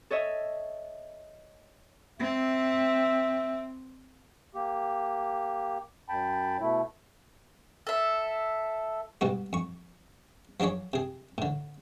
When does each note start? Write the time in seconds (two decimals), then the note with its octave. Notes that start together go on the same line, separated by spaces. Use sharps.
0.11 A4 C#5 D#5 E5
2.19 C4 E5
4.55 A#3 G4
6.09 F#2 G5 A5 B5
6.60 B2 A3 E4
7.87 A4 E5
9.21 G#2 B2 G3 F#4
9.53 F2 C#6
10.60 F3 F#3 D4 G#4 C#5
10.93 C3 G#4
11.38 A2 D3